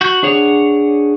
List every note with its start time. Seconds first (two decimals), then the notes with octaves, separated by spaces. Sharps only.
0.01 F#4 G6
0.23 D4 G#4 C#5 F#5